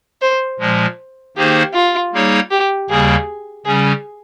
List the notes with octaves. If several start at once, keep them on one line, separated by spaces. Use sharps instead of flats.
C5
A#2 F3 G#3
D#3 A#3 D#4 G4 G#4 C5
F4
G3 A#3 D#4 G#4 C#5
G4
D#2 C#3 G3 A#3 G#4
C#3 G3 C#4 G#4